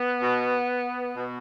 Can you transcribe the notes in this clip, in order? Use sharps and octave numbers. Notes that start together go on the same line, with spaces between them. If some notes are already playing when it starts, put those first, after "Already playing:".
Already playing: B3
B2
B2